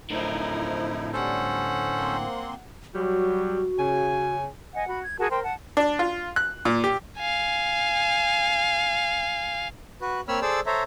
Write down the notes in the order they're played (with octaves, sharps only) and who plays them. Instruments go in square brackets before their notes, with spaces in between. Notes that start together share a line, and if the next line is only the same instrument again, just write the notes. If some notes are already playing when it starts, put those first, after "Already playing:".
[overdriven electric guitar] A2 D3 [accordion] F3 D#4 E4 [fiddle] A#4
[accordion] G3 [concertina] C#4 A4 C5 [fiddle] F#5
[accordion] A#3 C4 C6
[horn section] F#3 G3 [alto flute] F#4
[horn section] C#3 G#5
[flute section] D#5 F#5 G#5
F#4 B5
G#6
F#4 G#4 A#4 A5
A#4 C5 G5 C6
F#5 A5
[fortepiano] D4
F4
F#6
A#2
G4
[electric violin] F5 G#5
[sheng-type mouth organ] F#4 B4
A#3 C4 C#5 B5 E6 F6
G#4 A4 C5 D5 E6
A4 C5 C#5 E5 A#5